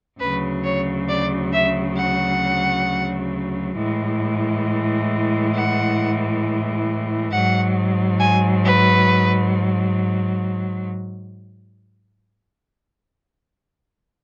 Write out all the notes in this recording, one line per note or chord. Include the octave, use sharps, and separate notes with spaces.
D2 C#3 F#3 B4
C#5
D5
E5
F#5
A2 E3 G#3
F#5
G#2 F#3 F#5
G#5
B4